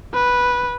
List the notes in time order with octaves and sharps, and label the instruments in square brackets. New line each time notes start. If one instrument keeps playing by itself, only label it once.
[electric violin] B4